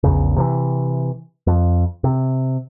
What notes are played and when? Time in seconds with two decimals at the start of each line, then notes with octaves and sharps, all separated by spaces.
0.04 A#1 E2 C#3
0.36 C3 D#3 E3
1.47 F2
2.04 C3